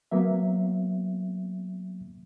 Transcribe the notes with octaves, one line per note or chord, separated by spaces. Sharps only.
F#3 A#3 B3 E5